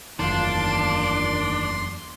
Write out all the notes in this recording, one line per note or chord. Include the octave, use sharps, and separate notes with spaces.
F#1 E2 D#3 A#3 D4 F4 C6